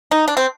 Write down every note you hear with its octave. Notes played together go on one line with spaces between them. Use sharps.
D#4
D4
C4